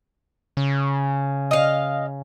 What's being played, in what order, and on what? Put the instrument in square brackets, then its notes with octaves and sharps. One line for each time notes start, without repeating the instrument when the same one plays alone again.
[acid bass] C#3
[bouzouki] D#5 F5